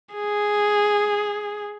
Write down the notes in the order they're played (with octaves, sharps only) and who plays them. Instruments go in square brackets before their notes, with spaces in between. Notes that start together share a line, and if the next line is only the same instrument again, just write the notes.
[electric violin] G#4